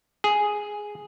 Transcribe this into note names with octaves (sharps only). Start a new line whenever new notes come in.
G#4